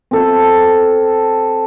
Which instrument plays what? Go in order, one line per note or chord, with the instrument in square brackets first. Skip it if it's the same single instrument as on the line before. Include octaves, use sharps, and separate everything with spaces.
[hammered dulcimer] C4 A4